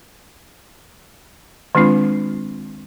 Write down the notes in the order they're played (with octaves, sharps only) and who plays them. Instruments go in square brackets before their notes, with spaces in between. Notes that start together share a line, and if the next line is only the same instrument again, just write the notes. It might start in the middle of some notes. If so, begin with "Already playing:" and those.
[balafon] D#3 G#3 C4 D4 F4